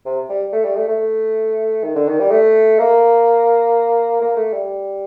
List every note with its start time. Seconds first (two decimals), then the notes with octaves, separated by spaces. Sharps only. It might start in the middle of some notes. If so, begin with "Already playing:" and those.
0.06 C3
0.29 G3
0.52 A3
0.64 G3
0.77 A3
0.88 A3
1.84 D#3
1.95 D3
2.08 D#3
2.19 G3
2.31 A3
2.79 A#3
4.21 A#3
4.37 A3
4.53 G3